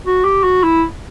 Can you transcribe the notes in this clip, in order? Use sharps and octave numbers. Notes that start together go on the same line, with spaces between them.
F#4
G4
F#4
E4